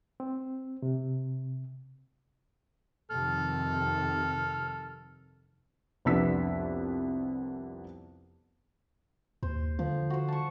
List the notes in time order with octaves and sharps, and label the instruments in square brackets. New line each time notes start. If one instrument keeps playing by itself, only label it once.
[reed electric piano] C4
C3
[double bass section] F2 C3 D#3 [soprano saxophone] A4 [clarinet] F6
[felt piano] C2 F2 B3 D4 E6 B6
[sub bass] D#2 [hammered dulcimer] C5
[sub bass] D3 [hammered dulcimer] F3
[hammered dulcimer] F#4 C5
A5 C#6